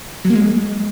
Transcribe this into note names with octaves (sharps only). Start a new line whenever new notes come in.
F#3
A#3
G#3